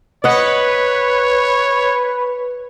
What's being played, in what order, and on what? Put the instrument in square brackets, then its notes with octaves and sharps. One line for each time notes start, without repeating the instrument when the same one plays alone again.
[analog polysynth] B4 [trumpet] C#5 [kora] D#5 F#5